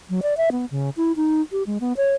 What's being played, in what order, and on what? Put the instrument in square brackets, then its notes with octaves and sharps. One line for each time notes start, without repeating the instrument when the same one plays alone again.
[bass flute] F#3
D5
E5
B3
C#3
E4
D#4
G4
G#3
B3
C#5